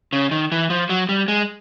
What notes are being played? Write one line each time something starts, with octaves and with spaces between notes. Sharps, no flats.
C#3
D#3
E3
F3
F#3
G3
G#3